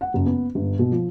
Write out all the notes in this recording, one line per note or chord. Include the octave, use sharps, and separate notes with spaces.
F#5
F#1
B3
G1
B2
F3